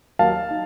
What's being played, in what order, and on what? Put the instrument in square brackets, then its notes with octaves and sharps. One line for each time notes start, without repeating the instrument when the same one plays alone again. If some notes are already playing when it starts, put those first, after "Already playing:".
[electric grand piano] D#2 D#3 F#3 A#3 D#4 F5 A5
D#4